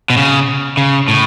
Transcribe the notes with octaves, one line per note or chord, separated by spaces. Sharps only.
B2
C#3
C#3
A2